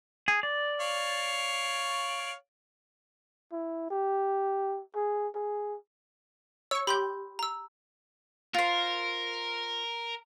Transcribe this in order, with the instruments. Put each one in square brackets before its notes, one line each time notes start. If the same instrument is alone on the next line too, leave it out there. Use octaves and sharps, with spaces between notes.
[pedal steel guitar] G#4
D5
[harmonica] C#5 F5
[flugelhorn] E4
G4
G#4
G#4
[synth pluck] C#5 C#6 [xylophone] E6
[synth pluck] G4 [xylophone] B5 C6 G6
[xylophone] A#5 E6
[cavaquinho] F4 C5 [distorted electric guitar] A#4